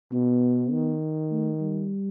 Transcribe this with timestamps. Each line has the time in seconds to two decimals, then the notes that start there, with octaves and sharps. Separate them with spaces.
0.12 B2 B3
0.71 D#3
1.31 A3
1.61 G3